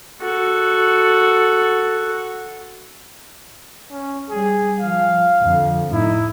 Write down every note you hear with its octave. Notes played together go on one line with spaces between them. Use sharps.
F#4 A4
C#4
G3 G#4
F3 F5
F2 D3
A2 D#4 E4